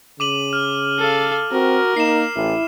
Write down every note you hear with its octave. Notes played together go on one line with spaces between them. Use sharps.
C#3 D6 D#7 F#7
F6
A4 F5
C4 F#4 A#4
A#3 D#4 C7 E7
A1 E4